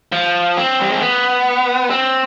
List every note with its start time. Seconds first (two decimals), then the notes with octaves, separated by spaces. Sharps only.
0.12 F3
0.57 C4
0.81 G3
0.90 G#3
1.02 B3
1.90 C4